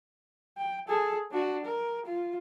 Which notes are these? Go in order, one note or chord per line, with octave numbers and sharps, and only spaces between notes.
G5
G#4 A4
D4 F#4
A#4
F4